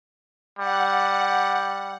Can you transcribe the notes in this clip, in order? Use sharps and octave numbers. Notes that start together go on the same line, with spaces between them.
G3 F#5